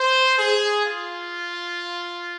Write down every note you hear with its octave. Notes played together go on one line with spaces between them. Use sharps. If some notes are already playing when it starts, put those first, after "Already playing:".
Already playing: C5
G#4
F4